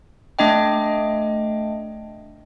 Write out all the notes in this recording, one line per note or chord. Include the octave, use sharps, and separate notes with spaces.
A3 D4 D#5 G5